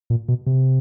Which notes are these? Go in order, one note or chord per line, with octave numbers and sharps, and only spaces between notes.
A#2
B2
C3